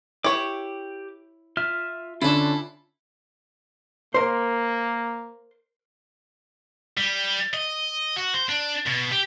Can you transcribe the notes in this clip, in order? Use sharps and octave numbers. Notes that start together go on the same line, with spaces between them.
E4 G4 C#5 D6
F4 E5 F6
D3 C#4 D4 E4 F4 A4 A5
A#3 A#4 C5
G3
D#5
F#4
C5
D4
B2
G4